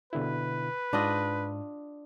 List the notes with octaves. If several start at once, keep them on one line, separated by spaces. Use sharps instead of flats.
B2 D3 E4 B4
G#2 D4 F4 D#5